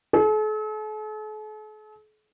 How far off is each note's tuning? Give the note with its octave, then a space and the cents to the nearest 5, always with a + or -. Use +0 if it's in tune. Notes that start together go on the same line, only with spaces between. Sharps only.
A4 -45